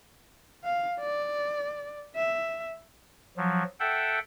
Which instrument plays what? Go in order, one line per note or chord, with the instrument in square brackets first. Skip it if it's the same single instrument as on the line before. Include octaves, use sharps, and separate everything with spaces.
[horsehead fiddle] F5
D5
E5
[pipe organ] F3 F#3
A4 E5 F#5 G5